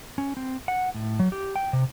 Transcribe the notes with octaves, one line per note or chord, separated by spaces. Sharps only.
C#4
C4
F#5
A2
F#3
G4
G5
C3